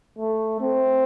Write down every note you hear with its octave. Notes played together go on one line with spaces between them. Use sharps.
A3
C4